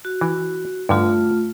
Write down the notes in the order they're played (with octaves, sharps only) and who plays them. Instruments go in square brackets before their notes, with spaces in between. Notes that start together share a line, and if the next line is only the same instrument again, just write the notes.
[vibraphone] F#4
[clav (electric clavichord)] E3
[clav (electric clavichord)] G2 D3 [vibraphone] A3 F4